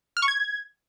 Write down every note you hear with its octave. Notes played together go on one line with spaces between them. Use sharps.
F6
C#6
G#6